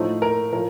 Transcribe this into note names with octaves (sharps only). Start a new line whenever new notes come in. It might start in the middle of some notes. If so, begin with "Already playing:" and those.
Already playing: A2 F3 A3 D#4 C5
A#4
A2 F3 A#4